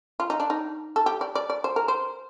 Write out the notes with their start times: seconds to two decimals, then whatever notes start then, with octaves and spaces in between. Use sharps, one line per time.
0.20 F4
0.30 D#4
0.40 D4
0.50 D#4
0.96 A4
1.06 G4
1.21 D5
1.35 D5
1.50 D5
1.64 C5
1.76 A#4
1.88 C5